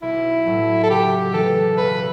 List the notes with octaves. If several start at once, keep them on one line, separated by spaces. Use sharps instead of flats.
B1 E4
A2 F#3 A3
A4
C#3 G4
E3 A3 E4 A4
E1 B4